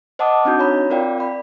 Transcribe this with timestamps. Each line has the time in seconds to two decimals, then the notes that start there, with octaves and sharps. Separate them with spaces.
0.19 C5 D#5 F#5 A5 D6 D#6
0.45 C4 D4 D#4 F#4 G6
0.59 C#5 A#5 B5
0.90 C4 F4 A#4 D5 F5 G5
1.18 D5 B5